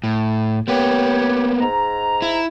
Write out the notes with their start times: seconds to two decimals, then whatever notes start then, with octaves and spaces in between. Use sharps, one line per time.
0.04 A2
0.68 A#3 B3 G4 C#5
1.60 G#2 A#5
2.22 E4